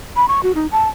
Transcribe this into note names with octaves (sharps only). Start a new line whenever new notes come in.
B5
C#6
F#4
D#4
A5